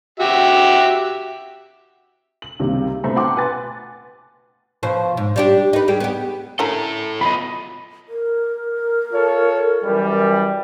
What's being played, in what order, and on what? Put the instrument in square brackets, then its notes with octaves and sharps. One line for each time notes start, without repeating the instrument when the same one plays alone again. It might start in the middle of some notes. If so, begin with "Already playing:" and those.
[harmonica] F#4 G4 E5
[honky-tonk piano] F#7
C#2 C3 D#3 G3 A#3
B2 A3 C4 A#5 B5
F#5 G5 A5 C6 D6
B4 G#5 A6
[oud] B2 F3 C5
G#2
G3 D4 G4
D#4 B4
G3 G#3 G4
B3 G4
[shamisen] D3 C#4 A#4 [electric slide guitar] E4 A4
[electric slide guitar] F#3 B3 F4 [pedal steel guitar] D#5 B5
[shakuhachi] A#4
[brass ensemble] F4 A4 C#5
F#2 E3 G3